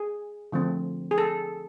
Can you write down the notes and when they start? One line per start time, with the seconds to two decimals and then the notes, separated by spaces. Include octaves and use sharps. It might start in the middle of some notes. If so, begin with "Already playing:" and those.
Already playing: G#4
0.52 D3 F3 A3 C4
1.11 G#4
1.18 A4